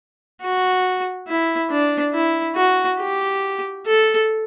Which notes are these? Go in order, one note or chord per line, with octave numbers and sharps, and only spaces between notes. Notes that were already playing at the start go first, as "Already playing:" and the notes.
F#4
E4
D4
E4
F#4
G4
A4